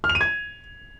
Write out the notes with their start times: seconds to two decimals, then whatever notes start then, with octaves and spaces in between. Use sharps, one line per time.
0.04 F6
0.09 F7
0.15 D#7
0.21 G#6